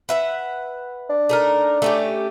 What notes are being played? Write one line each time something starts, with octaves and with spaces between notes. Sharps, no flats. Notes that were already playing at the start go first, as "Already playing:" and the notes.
B4 E5 F#5
D4
A3 D#4 A#4
A3 C#4 G4